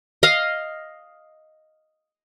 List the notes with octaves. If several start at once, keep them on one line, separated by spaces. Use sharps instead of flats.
D#5 F5